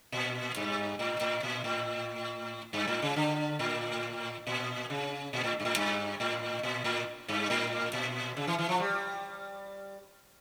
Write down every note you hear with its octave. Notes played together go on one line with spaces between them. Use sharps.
A#2
G2
A2
A2
A#2
A2
G2
A2
C#3
D3
A2
A#2
C#3
A#2
A2
G2
A2
G2
A2
A#2
A2
G2
A2
A#2
C#3
E3
E3
F3
G3